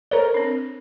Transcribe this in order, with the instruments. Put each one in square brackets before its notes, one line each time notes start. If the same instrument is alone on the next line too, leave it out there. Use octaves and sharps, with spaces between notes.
[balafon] A4 C5 [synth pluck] A#4 C#5
[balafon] C4 D4